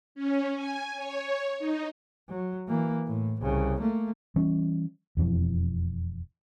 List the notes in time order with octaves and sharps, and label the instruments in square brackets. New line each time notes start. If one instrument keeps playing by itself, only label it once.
[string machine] C#4
G#5
C#5
D#4
[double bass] F#3
E3 A#3
A2
C2 C#3
A3 A#3
[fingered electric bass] E3 G3 C#4
E1 F2 E3 F3